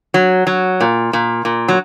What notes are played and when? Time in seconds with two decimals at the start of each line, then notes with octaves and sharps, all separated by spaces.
0.14 F#3
0.47 F#3
0.81 A#2
1.13 A#2
1.45 A#2
1.68 F#3